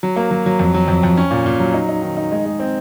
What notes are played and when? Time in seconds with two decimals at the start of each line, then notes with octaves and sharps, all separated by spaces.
0.03 F#3
0.16 A#3
0.31 F#3
0.46 F#3
0.59 F2
0.74 F#3
0.88 F2
1.03 F2
1.17 C#4
1.31 A#2
1.46 A#2
1.60 F#3
1.73 D#4
1.88 D#4
2.02 D#3
2.17 D#4
2.32 G#3
2.46 G#3
2.60 C4